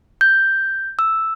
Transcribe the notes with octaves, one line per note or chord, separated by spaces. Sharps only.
G6
E6